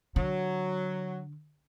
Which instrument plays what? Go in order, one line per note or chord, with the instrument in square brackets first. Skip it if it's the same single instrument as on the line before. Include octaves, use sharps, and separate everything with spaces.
[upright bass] D3 [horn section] F#3